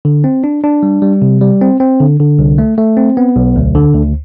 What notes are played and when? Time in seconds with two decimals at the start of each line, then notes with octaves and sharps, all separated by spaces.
0.05 D3
0.24 C4
0.44 D4
0.64 D4
0.83 G3
1.02 G3
1.22 C3
1.41 G3
1.61 C4
1.80 C4
2.00 D3
2.20 D3
2.39 C2
2.58 A3
2.78 A3
2.97 C4
3.17 B3
3.36 B1
3.56 D2
3.75 D3
3.94 D2